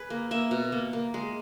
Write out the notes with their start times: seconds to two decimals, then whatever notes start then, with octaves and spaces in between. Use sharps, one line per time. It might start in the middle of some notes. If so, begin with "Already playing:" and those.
Already playing: G#4 B4
0.10 A#3
0.31 A#3 E5
0.51 B2
0.72 A#3
0.93 A#3
1.14 G#3